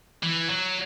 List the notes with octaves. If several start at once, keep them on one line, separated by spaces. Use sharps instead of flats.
E3
F#3